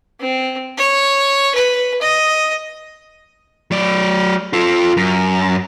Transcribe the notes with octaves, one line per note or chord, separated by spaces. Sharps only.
C4
C#5
B4
D#5
F#3 D5
F4 A4
F#2